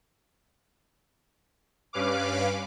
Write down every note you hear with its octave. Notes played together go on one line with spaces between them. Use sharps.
G2 C#4 B4 F5 D6